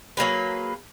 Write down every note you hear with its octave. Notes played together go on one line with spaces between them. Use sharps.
F#3 A#3 G#4 B4